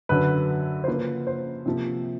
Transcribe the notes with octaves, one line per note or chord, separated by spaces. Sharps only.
F#2 D3 F#3 B4
C5
C#3 F3 A#3 B4
C5
C3 F3 A#3